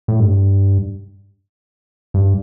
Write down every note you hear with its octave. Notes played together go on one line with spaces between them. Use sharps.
A2
G2
G2